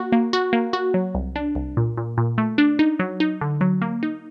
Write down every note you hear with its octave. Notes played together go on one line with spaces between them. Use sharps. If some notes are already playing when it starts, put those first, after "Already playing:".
Already playing: A#3 F#4
A#3
F#4
A#3
F#4
F#3
C2
D4
C2
A#2
A#2
A#2
A3
D4
D#4
F#3
D#4
D3
F#3
A#3
D#4